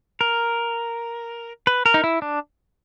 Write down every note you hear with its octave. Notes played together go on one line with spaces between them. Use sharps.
A#4
B4
A#4
D#4
E4
D4